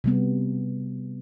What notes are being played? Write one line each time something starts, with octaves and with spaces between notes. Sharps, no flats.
C3 G3 B3